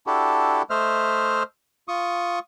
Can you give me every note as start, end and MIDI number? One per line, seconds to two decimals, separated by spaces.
0.07 0.63 62
0.07 0.63 64
0.07 0.63 66
0.07 0.63 67
0.07 0.63 69
0.70 1.43 57
0.70 1.43 72
0.70 1.43 75
0.70 1.43 76
0.70 1.43 89
1.88 2.39 65
1.88 2.39 85
1.88 2.39 87